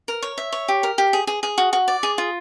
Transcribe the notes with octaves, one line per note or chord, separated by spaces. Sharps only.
A#4
C#5
E5
C#5
G4
A#4
G4
G#4
G#4
G#4
F#4
F#4
D5
G#4
F4